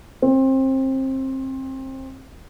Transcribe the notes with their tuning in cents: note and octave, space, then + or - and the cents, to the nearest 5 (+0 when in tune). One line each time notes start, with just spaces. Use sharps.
C4 +25